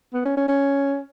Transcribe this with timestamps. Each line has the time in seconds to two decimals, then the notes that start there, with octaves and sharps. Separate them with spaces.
0.14 B3
0.25 C#4
0.37 C#4
0.49 C#4